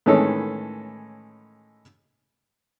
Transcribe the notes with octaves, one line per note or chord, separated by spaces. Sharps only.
A2 D#3 E3 G#3 C#4 A4